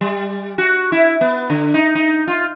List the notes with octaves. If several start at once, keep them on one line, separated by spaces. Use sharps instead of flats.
G3
F#4
E4
B3
D3
D#4
D#4
F4